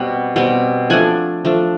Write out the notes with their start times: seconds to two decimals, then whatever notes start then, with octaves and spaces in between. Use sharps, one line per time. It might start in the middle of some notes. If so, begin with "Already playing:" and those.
Already playing: B2 G3 C4 F#5
0.36 B2 G3 C4
0.90 F3 A3 D4 F#5 G#5
1.45 F3 A3 D4